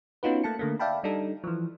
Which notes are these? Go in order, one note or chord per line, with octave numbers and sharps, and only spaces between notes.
B3 C#4 D#4 F4 F#4 B4
A3 A#3 A5 C#7
D3 A3 A#3
D5 E5 F5 G5 A5 B5
G3 D4 D#4 A4
E3 F3